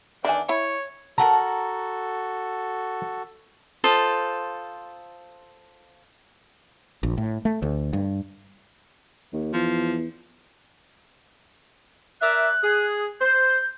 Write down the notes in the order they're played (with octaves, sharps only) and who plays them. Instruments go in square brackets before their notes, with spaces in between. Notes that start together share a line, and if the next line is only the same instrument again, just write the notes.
[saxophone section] E2 D4 [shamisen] D#3 E5 G#5
[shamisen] E4 [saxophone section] C#5
[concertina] F#4 A4 [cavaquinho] A#4 F#5 A#5 [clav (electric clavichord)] A5
[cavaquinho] F4 A4 C5 D#5
[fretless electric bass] A#1
A2
A3
D2
G2
[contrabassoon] D#2
[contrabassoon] E2 [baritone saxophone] F3
[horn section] A#4 D5 E5 [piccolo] F#6
[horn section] G#4
[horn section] C5 [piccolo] G6